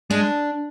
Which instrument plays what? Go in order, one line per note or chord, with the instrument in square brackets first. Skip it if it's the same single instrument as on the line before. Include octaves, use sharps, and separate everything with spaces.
[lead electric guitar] G#3 [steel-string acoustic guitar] D4